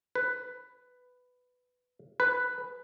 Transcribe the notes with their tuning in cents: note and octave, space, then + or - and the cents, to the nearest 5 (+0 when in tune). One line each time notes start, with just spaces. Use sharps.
B4 +10
B4 +5